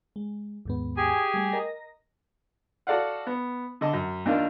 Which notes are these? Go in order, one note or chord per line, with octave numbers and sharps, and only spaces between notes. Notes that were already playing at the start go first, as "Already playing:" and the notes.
G#3
D#2 G#2 B3
G4 G#4 G#5
G3 A3
A#4 D#5 A#6
F#4 A4 D5 F5 F#5
B3
D3 D#5 A5
F#2
D#2 D4 D#4 F4 A#4